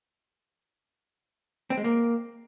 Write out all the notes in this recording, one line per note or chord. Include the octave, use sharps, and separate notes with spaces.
C4
G#3
A#3